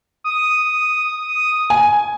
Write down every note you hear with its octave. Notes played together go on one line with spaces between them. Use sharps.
D#6
G#5